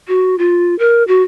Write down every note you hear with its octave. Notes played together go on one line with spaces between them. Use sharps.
F#4
F4
A#4
F#4